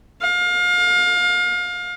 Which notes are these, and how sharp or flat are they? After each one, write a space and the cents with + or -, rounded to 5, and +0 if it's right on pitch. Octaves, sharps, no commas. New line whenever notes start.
F5 +30